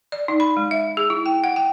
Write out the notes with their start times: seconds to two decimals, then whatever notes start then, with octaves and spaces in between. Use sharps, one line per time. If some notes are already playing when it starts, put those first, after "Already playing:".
0.12 D5
0.28 D#4
0.40 B5
0.57 G#3
0.71 E5
0.97 G#4
1.10 E4
1.26 G5
1.44 F#5
1.56 G5